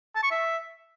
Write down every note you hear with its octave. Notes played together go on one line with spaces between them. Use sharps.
A5
C#6
E5